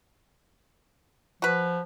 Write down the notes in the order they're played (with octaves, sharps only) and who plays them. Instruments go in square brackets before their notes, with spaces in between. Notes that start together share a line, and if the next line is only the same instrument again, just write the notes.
[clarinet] F3 [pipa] F#4 B4